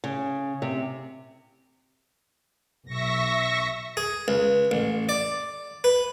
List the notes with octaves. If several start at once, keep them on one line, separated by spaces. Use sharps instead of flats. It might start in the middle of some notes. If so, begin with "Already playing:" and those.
C#3
C3
B1 E5 C#6 A#6
G#4
C#2
A1
D5
B4